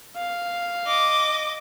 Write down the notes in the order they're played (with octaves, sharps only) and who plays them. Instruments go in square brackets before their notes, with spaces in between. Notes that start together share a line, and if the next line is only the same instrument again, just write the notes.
[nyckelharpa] F5
[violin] D#5 D6